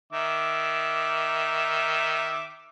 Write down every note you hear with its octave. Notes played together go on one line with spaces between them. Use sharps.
D#3 E5 D6